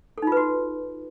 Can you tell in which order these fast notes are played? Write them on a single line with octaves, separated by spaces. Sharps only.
A4 D#4 F4 B4 F#4